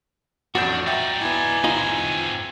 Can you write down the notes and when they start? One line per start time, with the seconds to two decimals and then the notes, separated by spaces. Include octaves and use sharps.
0.55 A1 F2 D4 F#4 G6
0.87 D#4 D5 E5 G5
1.21 B3 E4 G#5
1.64 C4 D#4 F4 G#4